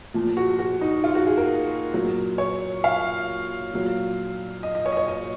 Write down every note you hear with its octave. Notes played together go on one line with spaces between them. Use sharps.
A#2 F3
F#4
F#4
D#4
F4
F#4
G#4
A#4
A#2 F#3
C#5
F5
A#2 F#3
D#5
D#5
C#5
D#5
C#5
D#5